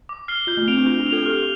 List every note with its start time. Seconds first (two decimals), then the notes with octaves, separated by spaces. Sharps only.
0.09 D6
0.28 F6 C7 G7
0.47 F4 G6
0.57 A3
0.68 C4 D7 F7
0.77 D4
0.86 F4 G6
0.99 F4
1.07 F7
1.13 A4
1.25 G4 F6